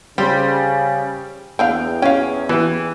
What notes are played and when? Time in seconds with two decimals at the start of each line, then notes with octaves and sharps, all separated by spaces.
0.18 C#3 G3 C4
1.59 E2 D3 B3 F5 G5
2.02 C#4 F5 G5
2.49 E3 B3 G4